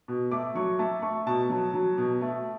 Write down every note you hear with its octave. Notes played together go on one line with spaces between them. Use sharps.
B2
A3 D6
F#3 C#6
A3 A5
A3 C#6
B2 A5
F#3
F#3
B2
A3